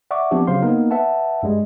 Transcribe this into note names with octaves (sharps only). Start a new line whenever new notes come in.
D5 E5 F#5 C#6 D6
F3 B3 C4 D4 G4
C#3 F#3 C5 F5 C6
A#3 B3 D#4 A#4
B4 E5 F#5 A5
G2 G3 G#3